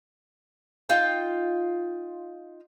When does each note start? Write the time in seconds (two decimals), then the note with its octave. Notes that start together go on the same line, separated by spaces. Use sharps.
0.89 D#4 F4 G5